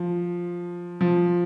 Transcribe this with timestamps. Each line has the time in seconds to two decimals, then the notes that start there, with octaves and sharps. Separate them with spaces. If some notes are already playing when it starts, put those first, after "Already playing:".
Already playing: F3
1.01 F3